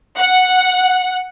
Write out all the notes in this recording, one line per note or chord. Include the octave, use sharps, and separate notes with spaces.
F#5